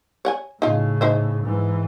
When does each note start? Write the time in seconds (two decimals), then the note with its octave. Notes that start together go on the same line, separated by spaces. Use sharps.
0.25 C#5 F#5 G#5
0.62 A2 C#3 D#4 F4
1.01 D#4 C5 E5
1.43 G#2 E3